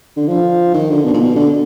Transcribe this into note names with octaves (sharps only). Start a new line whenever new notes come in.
D3
F3
D#3
D3
B2
A#2
B2
D3